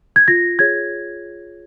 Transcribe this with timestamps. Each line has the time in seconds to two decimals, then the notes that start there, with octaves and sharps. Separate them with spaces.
0.16 G#6
0.28 F4 A#6
0.59 G#4 C#5 G#6